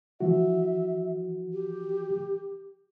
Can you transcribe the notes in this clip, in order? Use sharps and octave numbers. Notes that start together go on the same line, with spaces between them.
E3 F3 F#4 E5
G4